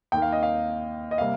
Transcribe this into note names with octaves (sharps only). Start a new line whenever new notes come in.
D#2 D#3 A#3 G5
F5
D#5
F5
D#5
C3 G3 A#3 F5